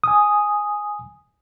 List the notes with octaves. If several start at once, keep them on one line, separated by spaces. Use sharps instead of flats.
G#5 D#6